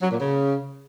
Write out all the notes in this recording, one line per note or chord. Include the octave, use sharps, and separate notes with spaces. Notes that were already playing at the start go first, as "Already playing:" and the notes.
F#3
A#2
C#3